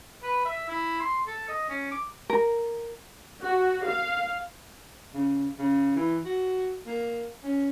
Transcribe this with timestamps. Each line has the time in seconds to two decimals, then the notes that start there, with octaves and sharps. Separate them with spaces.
0.23 B4
0.46 E5
0.69 E4
1.00 C6
1.27 A4
1.49 D#5
1.69 C#4
1.92 D6
2.30 A#4
3.41 F#4
3.86 F5
5.14 C#3
5.59 C#3
5.96 E3
6.25 F#4
6.86 A#3
7.44 C#4